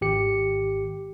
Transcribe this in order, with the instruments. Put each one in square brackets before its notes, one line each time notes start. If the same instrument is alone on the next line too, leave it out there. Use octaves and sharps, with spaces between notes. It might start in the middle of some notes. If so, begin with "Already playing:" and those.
[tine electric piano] G#1 G4 C#7